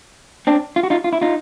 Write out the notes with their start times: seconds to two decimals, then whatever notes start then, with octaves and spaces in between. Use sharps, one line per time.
0.47 C4 D4
0.76 F4
0.83 F#4
0.90 D#4 F4
1.04 F4
1.13 E4
1.21 D#4 F4